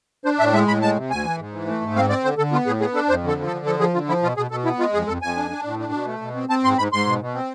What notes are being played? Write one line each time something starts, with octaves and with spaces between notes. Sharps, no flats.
D4 C5
A2 E5
G#3 E5
A2 B5
G#3 A5
C3
D2 G#5
E3
G#2
E3
A3
G#2
C4 F5
C4 D5
D3 C5
D3 A4
B3 F4
A2 G#4
B3 G#4
D4 A4
F2 C5
D3 A4
F3
A4
D3
F3 A4
F3 G#4
D3 F4
F3 E4
B2 F4
B2 G#4
B2 A4
B3 E4
G#3 F4
F2 G#4
F2 A4
F2 G#5
D4
D4
A2
D4
B2
A3
B2
C4
C4 A5
G#2 C6
G#2 B5
G#2 C6
B2
B2
C4